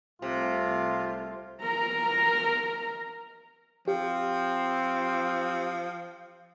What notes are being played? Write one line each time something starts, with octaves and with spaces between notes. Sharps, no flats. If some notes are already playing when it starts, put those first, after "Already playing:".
C2 C3 A3 F4
A#4 A#5
F3 C4 G4